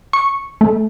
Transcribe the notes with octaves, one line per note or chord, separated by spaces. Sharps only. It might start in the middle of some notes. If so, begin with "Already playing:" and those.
C#6
A3